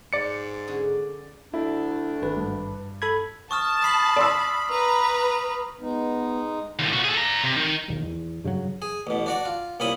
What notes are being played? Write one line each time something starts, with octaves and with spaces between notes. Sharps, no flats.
G#2 D5 C#7
D3 C#4 G#4
D2 D4 E4
G#1 B4
G2
A4 B5 G#6
A5 C#6 D#6 F6
B5 D#6 C7 F#7
D5 C6 E6
B4 A#5
G#3 B3 D#4
D#2 A2
A#2 F#4
G#4 A4
D5 A#5
C3
D#3
E1 A#1 D#2 D#3
E2
G2 C#3 E3 F#3
G#4
A1 B2
D4 F#4 D5
F4
C2 A#2 C#4 B5 D#6